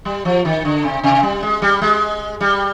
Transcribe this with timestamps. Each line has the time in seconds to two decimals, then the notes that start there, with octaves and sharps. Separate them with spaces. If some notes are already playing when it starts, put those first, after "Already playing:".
0.05 G3
0.25 F3
0.45 D#3
0.65 D3
0.84 C3
1.04 C3
1.23 G3
1.43 G#3
1.62 G3
1.82 G#3
2.40 G3